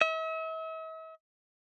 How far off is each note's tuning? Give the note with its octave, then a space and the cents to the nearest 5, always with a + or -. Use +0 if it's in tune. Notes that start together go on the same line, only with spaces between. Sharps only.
E5 -45